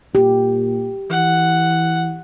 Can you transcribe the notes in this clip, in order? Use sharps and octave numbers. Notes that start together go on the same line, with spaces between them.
A#2 G4
E3 F#5